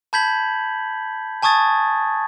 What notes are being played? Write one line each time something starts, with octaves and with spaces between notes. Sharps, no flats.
A5 B5 G6 G#6 B6 F#7
G#5 A5 C#6 D#6 G#6 A6